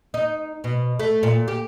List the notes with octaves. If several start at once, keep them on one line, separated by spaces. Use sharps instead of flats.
D#4
B2
A3
A#2
G4